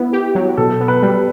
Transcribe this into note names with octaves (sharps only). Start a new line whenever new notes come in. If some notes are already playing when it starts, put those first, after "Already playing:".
Already playing: B3 E4
G4
F#3
B2 A4
B3
B4
G3